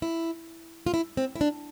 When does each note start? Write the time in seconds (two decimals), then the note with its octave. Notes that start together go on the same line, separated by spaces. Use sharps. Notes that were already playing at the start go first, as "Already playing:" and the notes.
0.02 E4
0.86 F4
0.94 E4
1.17 C4
1.36 E4
1.41 D4